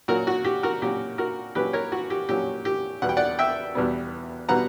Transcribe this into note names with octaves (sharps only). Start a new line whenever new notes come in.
A#2 F#3 C#4 F#4 A#4
F#4
G4
F#4 A#4
A#2 F#3 C#4 G4
F#4 A#4
A#2 F#3 C#4 G4 B4
A#4 C#5
F#4
G4
A#2 F#3 C#4 G4
G4
E2 B2 G3 B3 F#5
G5
D5 F#5
E5 G5
E2 B2 G3 B3
B2 G3 B3 F#5 A#5